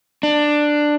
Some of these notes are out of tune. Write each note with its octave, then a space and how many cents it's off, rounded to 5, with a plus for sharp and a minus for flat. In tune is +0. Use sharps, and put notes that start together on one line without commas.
D4 +10